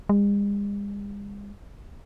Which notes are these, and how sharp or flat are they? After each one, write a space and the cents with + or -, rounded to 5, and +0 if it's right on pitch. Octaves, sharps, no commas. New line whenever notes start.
G#3 -45